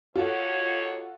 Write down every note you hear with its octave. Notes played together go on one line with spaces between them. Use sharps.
D#2 F4 F#4 A4 C#5